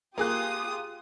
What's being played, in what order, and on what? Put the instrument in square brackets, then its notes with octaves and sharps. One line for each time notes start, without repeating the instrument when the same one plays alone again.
[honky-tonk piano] A#3 G#4 F#6 [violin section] F4 G4 D#6